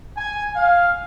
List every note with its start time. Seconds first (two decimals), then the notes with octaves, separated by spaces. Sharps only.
0.17 G#5
0.56 F5